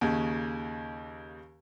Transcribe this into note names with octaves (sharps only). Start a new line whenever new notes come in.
D#2 C#3